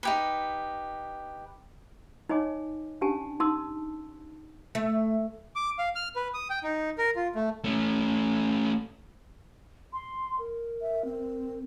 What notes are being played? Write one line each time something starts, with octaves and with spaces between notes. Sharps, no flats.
D#4 G4 B4
D#4 C#5 D#5 G#5 D6
C#4 D4 G4 G#5 A5
D#4 A5 C6 D#6 E6
A3
D6
F5
F6
B4
D#6
G5
D#4
A#4
F4
A3
A3 C#4
C6
A#4
E5
C4